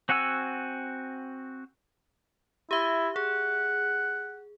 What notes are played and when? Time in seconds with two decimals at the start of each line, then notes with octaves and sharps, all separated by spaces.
0.09 C4 F#4 F#5 G#5 E6
2.71 E4 G4 E5
3.16 G#4 F#5